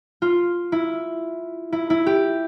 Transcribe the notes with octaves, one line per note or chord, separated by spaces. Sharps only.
F4
E4
E4
E4
G4